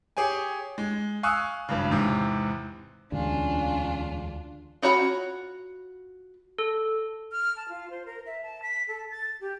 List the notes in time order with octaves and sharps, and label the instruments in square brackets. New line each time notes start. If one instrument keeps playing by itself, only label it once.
[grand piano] G4 G#4 C#5 G5 G#5
G#3
F5 G#5 C#6 D#6 E6 F#6
G#1 G2 C#3
E2 G#2 C3
[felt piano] E1 [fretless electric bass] D2 [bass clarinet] C#4 [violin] D4 F4
[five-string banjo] F4 F#4 C#5 A#5 B5
[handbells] A4
[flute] F6
A5
F4
C5
A#4
E5
A5
B6
A4
A6
G4